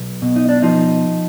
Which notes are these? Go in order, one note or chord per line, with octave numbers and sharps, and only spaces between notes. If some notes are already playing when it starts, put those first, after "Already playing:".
Already playing: B1
B2
D#4
D4
F3 D#4